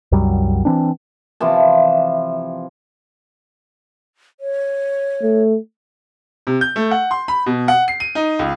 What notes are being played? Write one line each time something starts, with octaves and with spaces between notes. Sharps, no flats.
C2 F#2 F#3 G3
E3 C4 D4
C3 E3 F3 A5
C#5
A3
C3
G6
A3
F#5
C6
B5
B2
F#5
C7
D#7
D#4
C#2